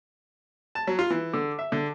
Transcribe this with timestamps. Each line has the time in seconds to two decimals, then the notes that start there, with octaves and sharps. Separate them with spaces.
0.75 A5
0.87 F#3
0.99 F4
1.10 E3
1.33 D3
1.59 E5
1.72 D3